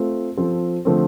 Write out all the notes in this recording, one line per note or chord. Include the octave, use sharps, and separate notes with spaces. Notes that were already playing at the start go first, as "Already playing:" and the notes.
Already playing: A3 C4 F4
F3 C4 F4 A4 C5
D3 F3 A3 C4